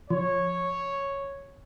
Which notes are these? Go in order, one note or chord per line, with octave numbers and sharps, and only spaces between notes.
F3 C#5